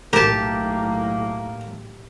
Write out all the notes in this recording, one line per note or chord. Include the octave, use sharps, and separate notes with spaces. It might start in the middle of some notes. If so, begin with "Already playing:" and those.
B1 A2 A#3 G4 A#4 A5